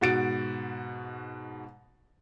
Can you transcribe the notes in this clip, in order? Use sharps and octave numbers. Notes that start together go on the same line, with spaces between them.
G#2 B2 F#4 A6 D7